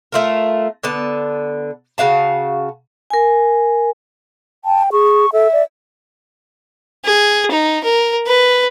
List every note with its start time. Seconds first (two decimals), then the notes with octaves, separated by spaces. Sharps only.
0.12 A3 F4 A#4
0.84 D3 B3 A5
1.98 C#3 F#4 F5 A5
3.10 A#4 G#5
4.65 G5 A5
4.92 G#4 C#6
5.33 A4 E5
5.53 D5
7.05 G#4
7.51 D#4
7.84 A#4
8.27 B4